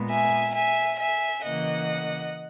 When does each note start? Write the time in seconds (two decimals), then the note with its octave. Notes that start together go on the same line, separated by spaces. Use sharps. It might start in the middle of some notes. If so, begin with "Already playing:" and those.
Already playing: A#2 G#3 B3
0.10 E5 G#5
0.54 E5 G#5
0.99 E5 G#5
1.44 C#3 E3 A#3 D#5 F#5